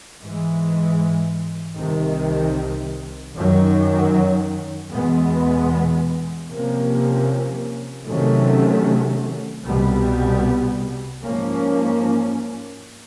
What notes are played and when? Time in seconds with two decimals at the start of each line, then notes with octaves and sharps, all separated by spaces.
0.20 G#2 E3 G#3
1.77 C2 C3 D#3
3.35 F#2 D#3 F#3
4.92 E2 B2 G#3 B3
6.50 C3 F3 A#3 C#4
8.08 C3 D#3 F#3 A3 C#4
9.65 C2 B2 G3 B3
11.22 G#2 F3 A#3 C#4